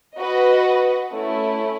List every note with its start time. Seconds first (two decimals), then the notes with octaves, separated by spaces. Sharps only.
0.19 F#4 B4 D#5 F#5
1.12 A3 C#4 E4